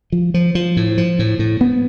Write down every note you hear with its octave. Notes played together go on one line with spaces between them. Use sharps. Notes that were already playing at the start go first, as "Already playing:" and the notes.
F3
F3
F3
A2
F3
A2
A2
B3